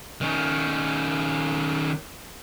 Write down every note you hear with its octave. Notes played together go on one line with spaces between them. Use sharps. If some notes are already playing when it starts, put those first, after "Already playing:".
D#3 C#4